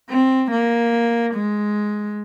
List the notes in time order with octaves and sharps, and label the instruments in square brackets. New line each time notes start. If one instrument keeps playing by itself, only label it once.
[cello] C4
A#3
G#3